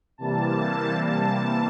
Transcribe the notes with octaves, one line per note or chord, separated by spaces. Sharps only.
C3 E3 G3 A#3 A5
A5